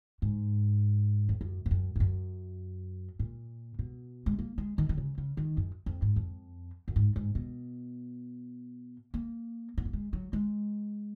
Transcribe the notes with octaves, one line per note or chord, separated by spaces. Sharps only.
G#2
F2
F#2
G#2
F#2
G#2
F#2
A#2
B2
G#3
A#3
G#3
D#3
D#3
C#3
C#3
D#3
F#2
F2
G#2
F2
F#2
G#2
G#2
B2
A#3
B3
A#3
G#3
F#3
G#3